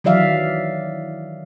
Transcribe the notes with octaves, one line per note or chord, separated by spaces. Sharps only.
D#3 E3 F#3 D5 E5 F5